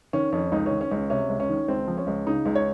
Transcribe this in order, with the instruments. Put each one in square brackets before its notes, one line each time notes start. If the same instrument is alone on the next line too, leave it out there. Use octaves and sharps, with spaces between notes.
[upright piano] D#3 C#4
F2 C#4
C#2 D#4
C#4
D#3
C#4
C#2 C#4
C3 C#4
C#2
C#4
D#3
C#2 C4
F3
C#4
C#2
C#3 D#4
C#2
C#5